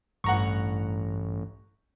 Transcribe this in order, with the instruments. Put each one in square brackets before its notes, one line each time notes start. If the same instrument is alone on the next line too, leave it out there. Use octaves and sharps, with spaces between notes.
[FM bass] A1 [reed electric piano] G2 [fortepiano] F#5 A#5 C#6